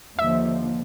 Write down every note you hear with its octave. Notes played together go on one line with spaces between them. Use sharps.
D#2 D3 F3 E5